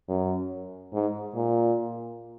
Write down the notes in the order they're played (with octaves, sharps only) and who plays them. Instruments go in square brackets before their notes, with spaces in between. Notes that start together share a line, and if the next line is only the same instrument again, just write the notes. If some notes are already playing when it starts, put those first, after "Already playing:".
[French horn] F#2
G#2
A#2